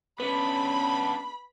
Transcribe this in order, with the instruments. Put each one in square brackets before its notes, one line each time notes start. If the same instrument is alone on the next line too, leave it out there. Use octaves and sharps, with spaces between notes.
[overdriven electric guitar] B3 D4 [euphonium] C#4 [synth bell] B4 [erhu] B5